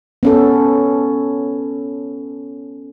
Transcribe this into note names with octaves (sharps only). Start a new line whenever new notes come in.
B3 C#4 A4